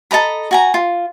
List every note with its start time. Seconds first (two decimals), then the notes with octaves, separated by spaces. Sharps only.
0.11 A4 D#5 A#5 B5
0.51 F#4 G#5 A#5
0.74 F4